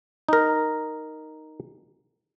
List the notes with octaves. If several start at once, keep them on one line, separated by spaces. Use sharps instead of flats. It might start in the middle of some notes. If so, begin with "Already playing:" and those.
D#4 A#4